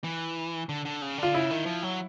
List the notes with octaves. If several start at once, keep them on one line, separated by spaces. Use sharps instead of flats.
E3
D3
D3
C#3
D3 F4
C#3 E4
D#3
F3
F#3